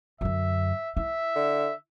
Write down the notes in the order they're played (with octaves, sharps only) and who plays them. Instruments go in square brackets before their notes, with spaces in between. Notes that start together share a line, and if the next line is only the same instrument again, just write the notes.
[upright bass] F#2 D3 [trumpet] E5
[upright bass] E4 [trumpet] E5
[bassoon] D3